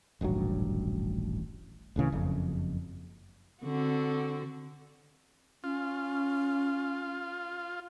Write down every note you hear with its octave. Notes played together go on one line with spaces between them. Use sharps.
D#1 A1 G2 F#3
D1 A2 C#3 E3
F#1 F2
D3 C4 F#4
C#4 F4